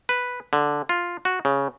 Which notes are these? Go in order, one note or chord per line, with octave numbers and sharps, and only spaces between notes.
B4
D3
F4
F#4
C#3